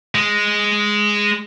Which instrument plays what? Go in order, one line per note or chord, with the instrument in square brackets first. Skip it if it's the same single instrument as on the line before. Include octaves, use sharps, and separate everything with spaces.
[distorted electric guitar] G#3